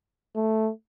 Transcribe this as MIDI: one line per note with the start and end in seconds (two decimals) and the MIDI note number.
0.36 0.70 57